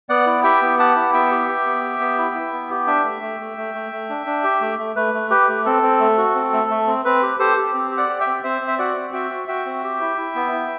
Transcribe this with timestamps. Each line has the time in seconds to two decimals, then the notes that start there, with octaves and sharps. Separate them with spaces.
0.09 B3 D5 F#5
0.26 E4
0.43 G4 E5 G5
0.62 B3
0.79 G4 F#5 A5
0.96 E4
1.13 B3 E5 G5
1.31 G4
1.48 G4
1.66 B3
1.84 G4
2.00 B3
2.18 E4
2.35 E4
2.53 B3
2.70 G4
2.87 D4 E5 G5
3.04 A3
3.22 A3
3.40 A3
3.58 A3
3.75 A3
3.92 A3
4.09 D4
4.26 D4
4.44 G4
4.61 A3
4.79 A3
4.96 A3 B4
5.14 A3
5.30 G4 B4
5.48 A3
5.66 C4 A4
5.83 C4
6.00 A3
6.18 F#4
6.35 C4
6.53 A3
6.70 A3
6.87 C4
7.05 C4 B4
7.23 G4
7.39 G4 A4 C5
7.57 G4
7.74 C4
7.91 G4
7.97 D5 F#5
8.09 G4
8.20 E5 G5
8.27 C4
8.43 C4 C5 E5
8.61 C4
8.68 E5
8.78 F#4 D5 F#5
8.96 C4
9.13 F#4 E5 G5
9.31 F#4
9.48 F#4 E5 G5
9.65 C4
9.84 G4
10.01 E4
10.17 E4
10.35 B3
10.52 E4